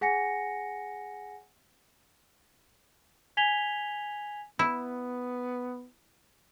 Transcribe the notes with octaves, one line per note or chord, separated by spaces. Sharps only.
G#4 F#5 G#5 A#6 C#7
G#5 G#6 B6 F7 G7
B3 E4